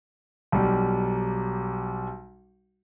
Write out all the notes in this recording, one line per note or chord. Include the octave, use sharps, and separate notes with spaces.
B1 G3